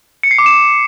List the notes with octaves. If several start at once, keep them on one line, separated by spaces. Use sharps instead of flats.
C#7
C7
D6
E7